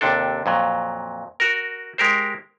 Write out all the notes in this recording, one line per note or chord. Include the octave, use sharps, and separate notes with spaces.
D#2 C3 D4 A4
F2 A#2 F#3
F#4 A#4
G#3 G4 A#4 C5